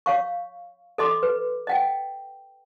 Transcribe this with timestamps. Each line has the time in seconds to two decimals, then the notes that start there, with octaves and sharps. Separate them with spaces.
0.06 C#5 F5 C#6
0.98 A4 D#5 C6 D6
1.23 B4
1.67 D#5 F#5 G5